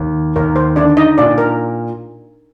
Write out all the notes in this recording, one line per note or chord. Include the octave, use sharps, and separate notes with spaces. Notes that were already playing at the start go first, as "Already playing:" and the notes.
Already playing: D#2
D#2 A#4
C5
D3 D4 D5
D#4 D#5
A#2 D4 D5
A#4